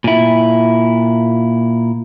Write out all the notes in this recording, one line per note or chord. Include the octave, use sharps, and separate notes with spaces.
A#2 E4